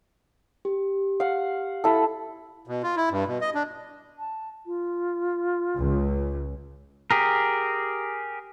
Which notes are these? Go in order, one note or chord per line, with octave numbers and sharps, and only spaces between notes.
G4
F5 F#5
E4 A4
B2
F4
E4
G2
B2
D#5
D4
A5
F4
C#2
G4 G#4 A#4